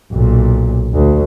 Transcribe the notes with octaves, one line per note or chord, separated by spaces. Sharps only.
B1 A#2
D2